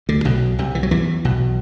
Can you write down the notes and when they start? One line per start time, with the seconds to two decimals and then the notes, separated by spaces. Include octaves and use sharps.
0.09 D2 D3
0.25 B1 B2
0.59 C2 C3
0.75 E3
0.83 F#3
0.91 E2 E3
1.25 B1 B2